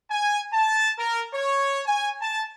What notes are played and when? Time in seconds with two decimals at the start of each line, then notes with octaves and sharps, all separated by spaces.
0.10 G#5
0.52 A5
0.98 A#4
1.33 C#5
1.87 G#5
2.21 A5